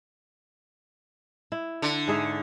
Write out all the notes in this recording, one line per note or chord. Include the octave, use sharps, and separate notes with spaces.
E4
D3
G#2 G#4 E5